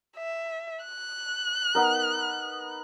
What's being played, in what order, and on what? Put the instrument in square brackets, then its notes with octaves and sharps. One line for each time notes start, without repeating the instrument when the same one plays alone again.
[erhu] E5
F#6
[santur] B3 D#4 A#4